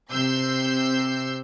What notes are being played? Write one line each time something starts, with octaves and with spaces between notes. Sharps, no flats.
C3 E6 G6 C7